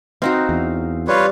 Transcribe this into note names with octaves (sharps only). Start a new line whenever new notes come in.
C4 D#4 F#4 F5
E2
G3 F4 B4 C#5